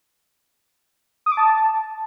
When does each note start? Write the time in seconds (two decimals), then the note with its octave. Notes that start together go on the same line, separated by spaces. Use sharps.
1.26 D#6
1.32 D6
1.37 A5